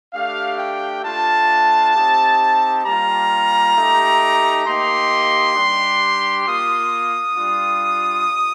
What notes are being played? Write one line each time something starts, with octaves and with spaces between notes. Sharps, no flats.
A3 D4 G4 F5
G5
A3 D4 F4 A5
C4 D#4 G4
G3 A#3 F4 A#5
A3 D#4 G4
A#3 D#4 G4 C6
G3 D4 G4
A#3 F4 D#6
G3 D4 F4